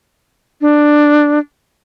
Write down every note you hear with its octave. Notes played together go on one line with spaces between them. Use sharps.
D4